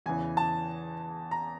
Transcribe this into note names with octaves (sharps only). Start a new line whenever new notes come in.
E2 C#3 E3 G#5
A5
A#5